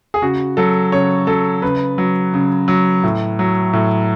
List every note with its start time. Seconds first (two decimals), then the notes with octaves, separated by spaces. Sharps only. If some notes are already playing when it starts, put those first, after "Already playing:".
0.14 G#4
0.22 C#3 F#4
0.57 F#3 A4
0.92 C#3 C#5
1.27 F#3 A4
1.62 C#3 B4
1.98 F#3
2.34 C#3
2.68 F#3
3.03 A2
3.39 F#3
3.73 A2